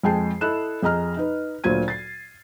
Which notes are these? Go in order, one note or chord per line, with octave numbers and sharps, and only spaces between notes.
F2 G#3 G#4 G5 A5 C7
E4 A4 D#5 F#6 E7
F2 G#4 D#5 A#5 F6
D#4 B4
D2 A#2 F#3 C5 G#6 D#7
A6 C7